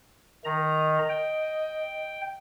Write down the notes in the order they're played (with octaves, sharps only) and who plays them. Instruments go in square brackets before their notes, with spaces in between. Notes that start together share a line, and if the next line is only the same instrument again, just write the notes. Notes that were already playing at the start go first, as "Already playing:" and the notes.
[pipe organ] D#3 A#5 [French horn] D#5
[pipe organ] G5